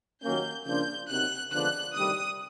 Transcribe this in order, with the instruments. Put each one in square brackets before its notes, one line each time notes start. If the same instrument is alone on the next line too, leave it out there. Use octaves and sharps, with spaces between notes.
[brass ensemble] D#2 D#3 F#3 A#3 C#4 [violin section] G6
[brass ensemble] C#3 F3 A#3 D4 F4 [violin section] G6
[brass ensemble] C3 D#3 F#3 [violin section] F#6
[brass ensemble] D3 F3 G#3 B3 D4 [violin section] F#6
[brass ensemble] D2 C3 D#3 G3 [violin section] D#6